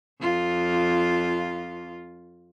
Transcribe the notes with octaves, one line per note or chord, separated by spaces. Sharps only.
F2 F4